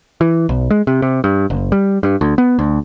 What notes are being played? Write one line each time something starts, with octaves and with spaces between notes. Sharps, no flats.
E3
B1
G#3
C3
C3
G2
F#1
G3
G2
D2
B3
D2